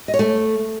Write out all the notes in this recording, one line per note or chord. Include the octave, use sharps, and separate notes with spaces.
D#5
C#5
A3